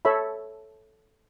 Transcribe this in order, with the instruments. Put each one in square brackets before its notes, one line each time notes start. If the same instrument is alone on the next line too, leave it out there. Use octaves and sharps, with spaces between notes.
[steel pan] A4 C#5 E5 B5